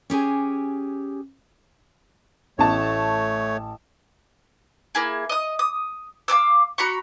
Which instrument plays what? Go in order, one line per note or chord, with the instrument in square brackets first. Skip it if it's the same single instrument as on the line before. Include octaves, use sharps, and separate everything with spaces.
[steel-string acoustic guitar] C#4 G4 G#4 G#5
[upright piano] A1 A5 [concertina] A3 C#5
[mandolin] A#3 E4 G#4
D#5 D#6
D#6
F5 G#5 D6 E6
F#4 A#5 B5 C#6